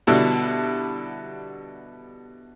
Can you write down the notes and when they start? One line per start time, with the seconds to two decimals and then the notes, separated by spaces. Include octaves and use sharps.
0.07 B2 D3 G3 E4